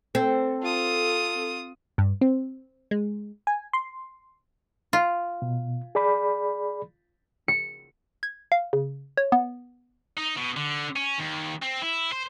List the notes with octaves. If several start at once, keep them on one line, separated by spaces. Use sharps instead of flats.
C4 A4
F4 D#6
G2
C4
G#3
G#5
C6
F4
B2
G#4 D5 B5
C#7
G#6
F5
C#3
C#5
B3
D#4
B2
D3
C#4
D#2
C4
E4
C5